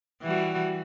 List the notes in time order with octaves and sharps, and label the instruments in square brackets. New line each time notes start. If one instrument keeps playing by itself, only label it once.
[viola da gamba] E3 G3 F#4